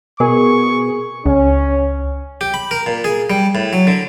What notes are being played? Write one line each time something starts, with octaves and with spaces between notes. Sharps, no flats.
B2 G#4 A#4 C#6
C#2 C#4
G4
B5
A#4
A#2
G#4
G3
A2
F#3
D3